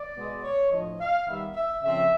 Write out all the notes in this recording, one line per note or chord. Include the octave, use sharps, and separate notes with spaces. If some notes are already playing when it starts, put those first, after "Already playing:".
Already playing: D5
B2 G#3 B3
C#5
A2 F3 A3 D4 D#5
F5
D#3 G3 B3 E5
E5
C#3 F3 A3 C4 E5